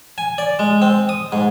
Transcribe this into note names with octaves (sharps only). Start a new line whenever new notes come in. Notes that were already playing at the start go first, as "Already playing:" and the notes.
G#5
D5
G#3
C4
D#6
G#2